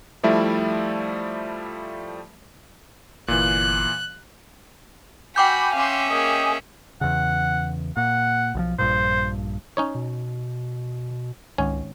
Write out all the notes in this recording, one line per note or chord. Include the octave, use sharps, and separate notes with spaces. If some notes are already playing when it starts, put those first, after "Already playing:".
F3 G3 A3 E4 D5 E5
G1 A#2 E3 F#6
F#4 G5 G#5 B5 D6 G6
C#4 E5 F5 C6
A#3 G#4 D#5
E2 C#3 F#5
A#2 F#5
B1 D#3 F3
A#1 G2 A#2 C5
C#4 D#4 C#5
B2
G#1 C#2 C#4 G#5